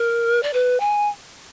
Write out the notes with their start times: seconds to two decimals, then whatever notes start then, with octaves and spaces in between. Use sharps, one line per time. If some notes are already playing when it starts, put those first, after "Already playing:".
Already playing: A#4
0.43 D5
0.53 B4
0.80 G#5